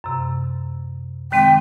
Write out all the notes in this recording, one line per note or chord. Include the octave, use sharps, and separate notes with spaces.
F#2 C3
D#3 G#3 C4 G5